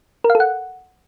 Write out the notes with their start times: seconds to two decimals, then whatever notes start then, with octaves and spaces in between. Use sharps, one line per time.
0.24 A#4
0.30 F5
0.35 A4
0.40 F#5